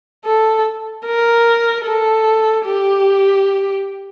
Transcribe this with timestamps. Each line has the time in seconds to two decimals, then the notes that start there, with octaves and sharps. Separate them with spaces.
0.25 A4
1.06 A#4
1.85 A4
2.65 G4